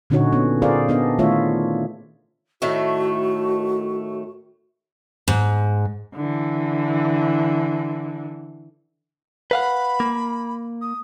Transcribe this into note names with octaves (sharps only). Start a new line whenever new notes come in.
A#2 D3 C#4 D#4 F#4 C#5
B3 C#4
F4 G#4 A#4 C5 D5 F5
B3 D4 D#5
D#3 A3 E4 F4 C#5 E5
A2 D#3 A3 F#4
G#2
D3 E3
B4 F5 F#5 B5
A#3
D#6